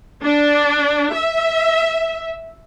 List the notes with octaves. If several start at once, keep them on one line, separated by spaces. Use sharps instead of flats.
D4
E5